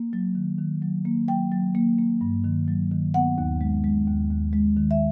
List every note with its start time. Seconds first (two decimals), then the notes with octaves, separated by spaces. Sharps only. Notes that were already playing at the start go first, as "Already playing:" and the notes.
Already playing: A#3
0.13 F#3
0.35 D#3
0.59 D#3
0.82 F#3
1.05 A#3
1.28 F#3 G5
1.52 F#3
1.75 A#3
1.98 A#3
2.21 G2
2.44 D#3
2.68 F#3
2.91 D#3
3.14 B3 F#5
3.38 D#2
3.61 G#3
3.84 G#3
4.07 D#2
4.31 D#2
4.53 G#3
4.77 D#3
4.91 E5